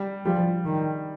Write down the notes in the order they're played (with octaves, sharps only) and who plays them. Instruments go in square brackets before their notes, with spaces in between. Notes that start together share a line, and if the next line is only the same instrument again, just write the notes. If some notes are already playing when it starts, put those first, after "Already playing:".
Already playing: [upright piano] G3
[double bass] F3 [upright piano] G3
[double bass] D#3